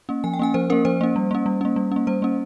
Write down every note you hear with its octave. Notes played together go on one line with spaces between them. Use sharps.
A#3 C#4
F3 G#5
G5
A#3 C#4 G#5
F3 C5
A#3 C#4 A#4
F3 C5
A#3 C#4
G3
A#3 C#4
G3
A#3 C#4
G3
A#3 C#4
G3 C5
A#3 C#4